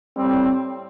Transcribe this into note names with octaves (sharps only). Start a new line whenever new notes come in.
A2 G3 C4